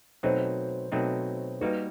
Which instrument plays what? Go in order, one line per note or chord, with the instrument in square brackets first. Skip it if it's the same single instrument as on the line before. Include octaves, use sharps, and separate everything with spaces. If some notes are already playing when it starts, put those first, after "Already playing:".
[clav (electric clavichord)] B2 F#3 A3 C4 D#4 [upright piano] C5
[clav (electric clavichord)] B2 F#3 A3 C4 D#4
[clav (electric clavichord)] G3 A#3 D#4 F#4 [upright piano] B4